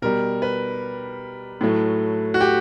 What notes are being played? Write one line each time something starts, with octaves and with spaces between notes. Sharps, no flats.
B2 G3 A#4
B4
A2 F#3 A3
F#4
G4